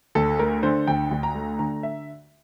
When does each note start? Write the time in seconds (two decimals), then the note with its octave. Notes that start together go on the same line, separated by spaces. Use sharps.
0.15 D2 A4
0.39 A3 A#4
0.63 D3 C5
0.87 D2 G5
1.11 D2
1.23 A#5
1.35 A3
1.59 D3 A#5
1.83 E5